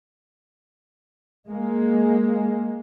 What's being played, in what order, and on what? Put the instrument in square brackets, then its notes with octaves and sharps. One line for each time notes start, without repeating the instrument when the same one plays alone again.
[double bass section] G#3 A#3